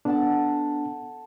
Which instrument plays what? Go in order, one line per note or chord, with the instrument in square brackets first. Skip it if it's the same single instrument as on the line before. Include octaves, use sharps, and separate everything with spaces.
[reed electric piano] B3 D4 [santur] A4 F#5 A5